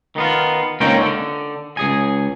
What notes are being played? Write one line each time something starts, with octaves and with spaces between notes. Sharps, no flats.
D#3 B3 F4
C#2 A#3 C4 C#4 D#4 G5
D3
C#2 G#4 G#5